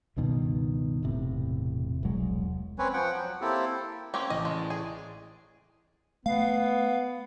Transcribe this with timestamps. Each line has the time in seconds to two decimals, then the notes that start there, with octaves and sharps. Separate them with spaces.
0.17 C#2 G2 B2 D#3
1.03 E1 A2 C3
2.03 E1 C2 F#3 G#3
2.79 C4 C#4 B4 C#5
2.94 F3 F#5 G5
3.13 F#3
3.41 A#3 C4 E4 G4 A4
4.14 A#3 C4 C#4
4.30 A1 D#5
4.45 G#3
4.57 D5
4.70 G#4
6.26 A3 B3 F5